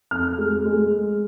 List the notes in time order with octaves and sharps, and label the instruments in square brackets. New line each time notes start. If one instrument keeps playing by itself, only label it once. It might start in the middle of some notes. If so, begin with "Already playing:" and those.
[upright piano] F2 F6
G#3
G#3